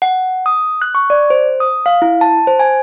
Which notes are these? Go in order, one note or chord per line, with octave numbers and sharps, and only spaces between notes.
F#5
D#6
F#6
C#6
D5
C5
D#6
F5
E4
A5
C5
G#5